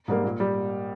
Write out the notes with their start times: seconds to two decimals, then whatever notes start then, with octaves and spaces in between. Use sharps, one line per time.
0.08 G#2 G3 A#3
0.24 A#2
0.40 G3